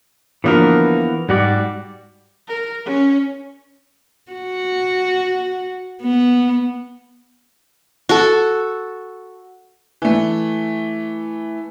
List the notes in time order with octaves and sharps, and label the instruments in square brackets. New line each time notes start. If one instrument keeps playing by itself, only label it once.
[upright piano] D3 F3 A#3 [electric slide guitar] E3 B3 A#4
[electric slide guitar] G#2 F#4 D5 [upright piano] G3
[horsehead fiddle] A#4
C#4
[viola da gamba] F#4
B3
[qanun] F#4 A4
[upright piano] E3 A3